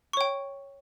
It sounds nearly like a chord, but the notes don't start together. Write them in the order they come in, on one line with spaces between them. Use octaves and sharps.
C#6 C#5 G5